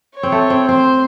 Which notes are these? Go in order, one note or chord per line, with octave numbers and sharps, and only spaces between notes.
C#5
C4
A3
C4
C4 C5